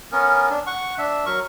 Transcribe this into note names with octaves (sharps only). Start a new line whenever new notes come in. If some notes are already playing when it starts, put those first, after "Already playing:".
B3 C#4 A#4
D4
F#5 C#6
D4 E5
F#3 A#4 C#6